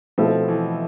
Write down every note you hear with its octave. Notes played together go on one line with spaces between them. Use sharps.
B2 F3 A3 C4 E4 A4
E3